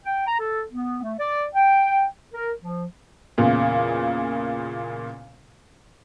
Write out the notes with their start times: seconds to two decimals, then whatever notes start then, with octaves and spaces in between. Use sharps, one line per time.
0.04 G5
0.27 A#5
0.40 A4
0.71 B3
1.03 A3
1.19 D5
1.54 G5
2.33 A#4
2.62 F3
3.38 E2 A#2 C#3